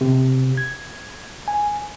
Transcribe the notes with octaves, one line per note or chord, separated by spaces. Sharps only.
C3
G#6
G#5